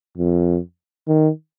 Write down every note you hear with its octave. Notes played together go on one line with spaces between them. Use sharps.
F2
D#3